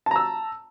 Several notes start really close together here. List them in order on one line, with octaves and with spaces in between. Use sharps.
A5 A#5 E6